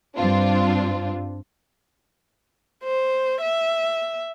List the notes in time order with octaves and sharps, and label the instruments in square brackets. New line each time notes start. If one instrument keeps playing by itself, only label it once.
[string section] G2 C4 D4 F4
[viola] C5
E5